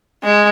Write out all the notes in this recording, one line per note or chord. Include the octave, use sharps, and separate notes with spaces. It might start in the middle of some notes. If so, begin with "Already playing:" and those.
G#3